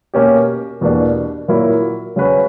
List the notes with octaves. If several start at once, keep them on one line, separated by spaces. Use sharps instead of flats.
B2 A#3 C#4 G4
E2 B2 A#3 D4 G4
A#2 F#3 A#3 E4 A#4
C#3 F#3 C#4 F#4 B4